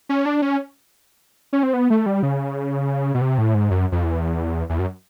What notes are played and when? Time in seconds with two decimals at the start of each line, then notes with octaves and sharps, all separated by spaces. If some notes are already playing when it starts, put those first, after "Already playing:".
0.09 C#4
0.26 D4
0.42 C#4
1.53 C#4
1.63 C4
1.73 B3
1.90 A3
2.06 G3
2.23 C#3
3.14 B2
3.21 C3
3.38 A2
3.54 G#2
3.71 F#2
3.92 F2
4.04 E2
4.70 E2
4.79 F#2